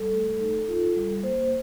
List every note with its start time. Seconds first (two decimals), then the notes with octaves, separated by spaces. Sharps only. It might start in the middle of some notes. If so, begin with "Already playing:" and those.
Already playing: G3 A4
0.13 A3
0.40 D#4
0.68 F4
0.96 G3
1.23 A#3 C5